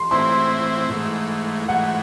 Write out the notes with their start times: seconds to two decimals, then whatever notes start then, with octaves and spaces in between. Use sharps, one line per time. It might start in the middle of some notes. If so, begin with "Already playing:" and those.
Already playing: C6
0.11 A2 E3 C4 E4 C5 C6
0.90 G#2 E3 A3
1.69 G#2 E3 A3 F#5